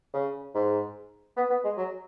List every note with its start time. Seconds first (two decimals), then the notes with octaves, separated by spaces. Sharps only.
0.14 C#3
0.54 G#2
1.37 B3
1.50 B3
1.64 G#3
1.77 F#3